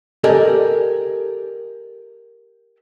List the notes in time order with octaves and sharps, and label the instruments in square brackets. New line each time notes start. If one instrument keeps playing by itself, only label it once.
[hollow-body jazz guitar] G4 A4 A#4 D5 D#5 G#5